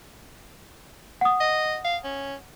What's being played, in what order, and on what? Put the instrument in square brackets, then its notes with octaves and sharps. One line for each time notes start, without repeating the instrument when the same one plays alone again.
[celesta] F#5 D#6
[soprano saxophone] D#5
F5
C#4